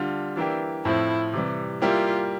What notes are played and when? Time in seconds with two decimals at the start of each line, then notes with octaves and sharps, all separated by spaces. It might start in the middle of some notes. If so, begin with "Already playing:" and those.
Already playing: D3 G3 D4 F4
0.36 E3 A#3 D4 E4 G4
0.85 A2 F3 C4 E4
1.33 C3 E3 G3
1.82 G3 A#3 E4 F4 G4